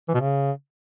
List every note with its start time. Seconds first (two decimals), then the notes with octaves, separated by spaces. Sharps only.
0.09 E3
0.14 B2
0.20 C#3